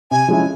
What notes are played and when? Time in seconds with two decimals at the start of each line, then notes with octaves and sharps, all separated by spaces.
0.11 C3 G#5
0.28 F3 G#3 C#4 E4